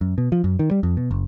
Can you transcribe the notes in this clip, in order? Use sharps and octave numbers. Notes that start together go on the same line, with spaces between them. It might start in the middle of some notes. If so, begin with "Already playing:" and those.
F#2
B2
F3
F#2
D#3
G3
F2
B2
F#1